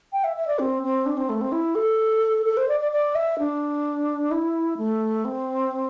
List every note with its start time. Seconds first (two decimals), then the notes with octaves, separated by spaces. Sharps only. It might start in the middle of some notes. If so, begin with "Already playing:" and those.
0.13 G5
0.24 E5
0.36 E5
0.47 D5
0.59 C4
0.83 C4
1.06 D4
1.17 C4
1.29 A3
1.41 C4
1.52 E4
1.75 A4
2.45 A4
2.57 C5
2.68 D5
2.80 D5
2.92 D5
3.15 E5
3.39 D4
4.31 E4
4.77 A3
5.25 C4